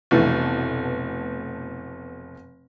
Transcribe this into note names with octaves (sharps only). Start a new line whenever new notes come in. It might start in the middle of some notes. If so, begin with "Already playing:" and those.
F1 B2 E3 A3